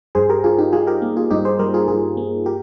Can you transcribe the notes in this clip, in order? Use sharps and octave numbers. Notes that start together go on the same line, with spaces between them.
G2 G#4 C5
G4 A#4
G2 F4 G#4
D#4 G4
G3 F4 G#4
G4 A#4
A#3
F4 G#4
G2 D#4 G4
G#4 C5
G3 G4 A#4
F4 G#4
G2 F4 G#4
A#3
G4 A#4